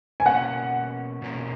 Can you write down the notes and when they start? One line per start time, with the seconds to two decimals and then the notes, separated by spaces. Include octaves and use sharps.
0.20 G#5
0.26 B2 A#3 C#4 F#5
1.22 B2 A#3 C#4